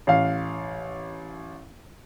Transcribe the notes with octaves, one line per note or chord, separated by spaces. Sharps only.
A1 F5